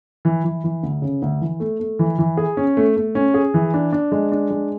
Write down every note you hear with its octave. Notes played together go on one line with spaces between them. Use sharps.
E3
E3
E3
D2
C#3
D2
E3
A3
A3
E3
E3
G#4
C#4
A3
A3
C#4
G#4
E3
D4
D4
G#3
D4
G#3